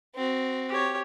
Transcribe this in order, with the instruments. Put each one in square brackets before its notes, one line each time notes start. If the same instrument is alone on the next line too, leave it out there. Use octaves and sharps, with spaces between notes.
[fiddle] C4 F#4
[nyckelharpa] G4 C#5